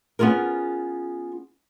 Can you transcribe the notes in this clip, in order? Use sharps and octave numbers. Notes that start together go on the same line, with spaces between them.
B3 C#4 F4 G#4 A#4